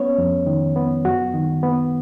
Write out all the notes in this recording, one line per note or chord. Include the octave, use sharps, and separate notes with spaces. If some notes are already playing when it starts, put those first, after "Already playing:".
Already playing: B3 C#4 C#5
F2
D#3
B3
F#2 F#4
D#3
B3